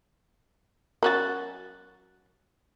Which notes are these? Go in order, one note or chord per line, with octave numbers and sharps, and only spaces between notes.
F#3 C#4 F#4 A#4 F#6 A6